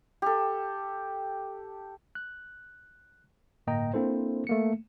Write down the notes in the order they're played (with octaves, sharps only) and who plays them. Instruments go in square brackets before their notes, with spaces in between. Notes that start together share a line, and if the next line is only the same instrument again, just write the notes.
[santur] G4 A4
[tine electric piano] F#6
G1 A2 A#3 D#5 G5 A#5
A#3 C4 D4 E4 A4 C5
A3 A#3 C#7